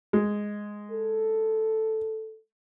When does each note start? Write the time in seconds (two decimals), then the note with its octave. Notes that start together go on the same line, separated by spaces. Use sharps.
0.13 G#3
0.92 A4